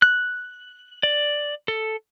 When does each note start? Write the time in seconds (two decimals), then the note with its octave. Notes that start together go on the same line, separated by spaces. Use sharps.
0.02 F#6
1.03 D5
1.68 A4